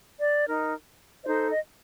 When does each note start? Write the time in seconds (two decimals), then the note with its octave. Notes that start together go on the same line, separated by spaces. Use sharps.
0.19 D5
0.46 D#4 A#4
1.23 D#4 A4 C5 D#5
1.50 D#5